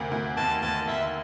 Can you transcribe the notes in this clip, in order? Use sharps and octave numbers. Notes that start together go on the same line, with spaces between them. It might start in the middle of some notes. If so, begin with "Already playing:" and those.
Already playing: D2 C3 A#3
D2
D#2 A5
D#2 A5
D#2 E5